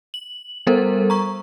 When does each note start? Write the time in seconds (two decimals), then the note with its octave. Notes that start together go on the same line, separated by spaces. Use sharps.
0.14 F#7
0.67 G3 B3 A4 A#4 C5
1.10 A#5 C#6